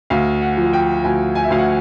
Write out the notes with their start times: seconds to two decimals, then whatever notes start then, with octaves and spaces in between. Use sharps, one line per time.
0.10 D2 F5
0.42 F#5
0.57 F3
0.73 G5
1.04 D2 G#5
1.35 G#5
1.44 E5
1.50 D2 F5
1.58 F#5